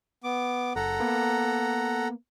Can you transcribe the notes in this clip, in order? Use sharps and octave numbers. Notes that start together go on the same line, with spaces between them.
B3 D6
F#1 A4 F#5 A#5
A#3 B3